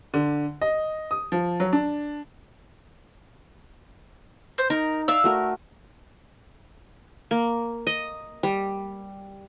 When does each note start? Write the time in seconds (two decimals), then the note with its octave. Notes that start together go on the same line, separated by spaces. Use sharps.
0.14 D3
0.61 D#5
1.11 D#6
1.32 F3
1.60 F#3
1.73 D4
4.58 C5
4.70 D#4 A#4
5.08 D5 E5 F5 E6
5.24 A3 F#4 A#4
7.31 A#3
7.87 D#5
8.43 G3